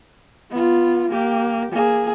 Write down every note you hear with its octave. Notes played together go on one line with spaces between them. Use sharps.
B3 F4
A#3 G4
A#3 G#4